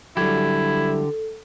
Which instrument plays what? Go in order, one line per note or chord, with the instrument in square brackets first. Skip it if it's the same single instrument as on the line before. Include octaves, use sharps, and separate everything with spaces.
[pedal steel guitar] D3 G4 [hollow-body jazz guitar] F#3 G3 [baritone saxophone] E4 [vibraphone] A4